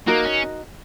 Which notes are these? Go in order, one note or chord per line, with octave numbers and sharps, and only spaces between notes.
A#3 D#4 F#4 A#4 D#5
C#4